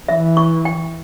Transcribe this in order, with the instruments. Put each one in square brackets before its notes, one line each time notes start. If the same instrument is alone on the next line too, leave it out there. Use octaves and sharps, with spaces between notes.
[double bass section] E3 [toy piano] E5
[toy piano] C#6
G5